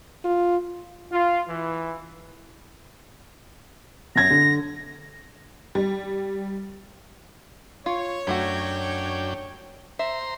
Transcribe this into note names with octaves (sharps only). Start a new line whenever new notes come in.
F4
F4
E3
F#2 G#6 A#6
D3
G3
F4 C#5
F#2 F#3 A3 D4 F#4 G5
C5 E5 A#5 C6